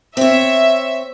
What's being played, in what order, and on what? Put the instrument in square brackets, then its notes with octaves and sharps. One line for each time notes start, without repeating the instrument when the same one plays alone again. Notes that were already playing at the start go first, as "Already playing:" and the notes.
[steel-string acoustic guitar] C4 C#5 [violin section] E5